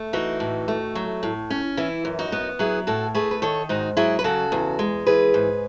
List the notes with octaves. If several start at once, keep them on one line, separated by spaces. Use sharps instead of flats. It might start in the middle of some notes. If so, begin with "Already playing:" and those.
Already playing: A3
E3 D#4 F#4
A2
A3
F#3
A2
C#4
E3 E4
F#2
D#4 F#4
B3
F#3 E4 G#4
A2 F#4 A4
A3 G#4 B4
B4
D#3 A4 C#5
G#2 D#4 F#4
F#3 E4 G#4
B4
C#3 F#4 A4
E2
G#3
E3 G#4 B4
G#2